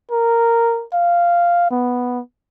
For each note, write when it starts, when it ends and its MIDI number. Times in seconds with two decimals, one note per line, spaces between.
0.11 0.84 70
0.93 1.69 77
1.71 2.21 59